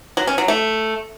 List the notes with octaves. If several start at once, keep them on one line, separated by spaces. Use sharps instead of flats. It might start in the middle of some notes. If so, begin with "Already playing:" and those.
F#3
C#4
F#3
A3